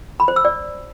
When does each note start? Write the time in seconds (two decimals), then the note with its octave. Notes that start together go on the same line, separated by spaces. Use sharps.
0.20 B5
0.28 C5
0.36 E6
0.45 D5